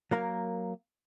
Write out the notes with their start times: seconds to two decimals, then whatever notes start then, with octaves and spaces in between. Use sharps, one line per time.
0.11 F#3 A#3 A#4